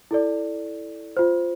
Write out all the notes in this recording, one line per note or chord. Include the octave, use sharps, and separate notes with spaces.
E4 A4 D5
F4 C5